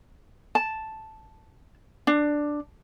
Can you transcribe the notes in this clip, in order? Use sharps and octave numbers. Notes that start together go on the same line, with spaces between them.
A5
D4